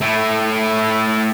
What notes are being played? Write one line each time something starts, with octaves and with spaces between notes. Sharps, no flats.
A3 E4